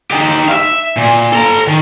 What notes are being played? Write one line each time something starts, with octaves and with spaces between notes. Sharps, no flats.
D#4 G4
E5 F5
A#2
A4 A#5
D#3